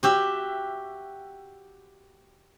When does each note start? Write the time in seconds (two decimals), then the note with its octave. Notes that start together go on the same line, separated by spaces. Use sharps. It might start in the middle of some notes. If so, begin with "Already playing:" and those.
0.03 F#4 G4 E5